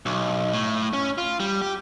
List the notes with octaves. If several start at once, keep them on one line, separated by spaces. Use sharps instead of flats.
B1
A2
C#4
F4
G3
G4